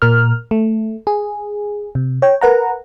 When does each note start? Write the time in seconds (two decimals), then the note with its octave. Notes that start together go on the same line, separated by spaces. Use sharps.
0.02 A#2 A#4 F6
0.51 A3
1.07 G#4
1.95 C3
2.22 C#5 G5
2.41 A#4 B4 F#5 A#5